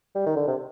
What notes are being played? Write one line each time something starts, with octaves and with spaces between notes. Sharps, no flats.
G3
D#3
D3
C3